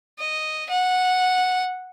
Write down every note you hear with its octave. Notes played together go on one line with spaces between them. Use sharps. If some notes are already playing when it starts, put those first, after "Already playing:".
D#5
F#5